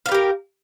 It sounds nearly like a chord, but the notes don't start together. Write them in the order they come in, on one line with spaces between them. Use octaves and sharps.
F5 B4 G4 A#4